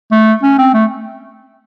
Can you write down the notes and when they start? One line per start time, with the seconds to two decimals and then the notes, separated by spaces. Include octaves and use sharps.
0.12 A3
0.43 C#4
0.58 C4
0.74 A3